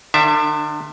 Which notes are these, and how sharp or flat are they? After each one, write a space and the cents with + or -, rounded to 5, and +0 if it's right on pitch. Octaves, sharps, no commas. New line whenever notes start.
D3 +45 D4 +5 E5 +0